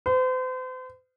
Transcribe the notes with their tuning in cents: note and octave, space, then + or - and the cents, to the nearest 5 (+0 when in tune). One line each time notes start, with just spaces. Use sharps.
C5 -40